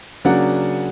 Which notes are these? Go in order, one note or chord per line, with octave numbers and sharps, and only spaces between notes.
C#3 F#3 A#3 D4 D5 F#5